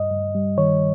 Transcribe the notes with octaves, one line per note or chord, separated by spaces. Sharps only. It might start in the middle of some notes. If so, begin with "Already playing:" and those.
Already playing: G2 D#5
G2
G3
D#3 C#5